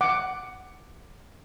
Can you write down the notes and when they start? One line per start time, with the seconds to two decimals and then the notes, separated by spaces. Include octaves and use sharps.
0.01 F#5 D6